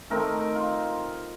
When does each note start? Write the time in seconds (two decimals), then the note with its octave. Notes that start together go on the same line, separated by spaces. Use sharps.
0.10 D#3 A3 C4 D#4 A#4
0.40 A#4
0.55 F4